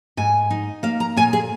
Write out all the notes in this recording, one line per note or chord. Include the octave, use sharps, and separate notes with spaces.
G#2 G#5
D#4
A#3 F5
A#5
A#2 G#5
G#4